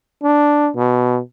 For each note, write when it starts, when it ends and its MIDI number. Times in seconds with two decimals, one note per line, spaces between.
0.23 0.70 62
0.76 1.20 47